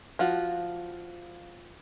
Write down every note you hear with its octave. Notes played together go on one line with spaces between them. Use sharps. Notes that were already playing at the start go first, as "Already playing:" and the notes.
F3 F4 F#4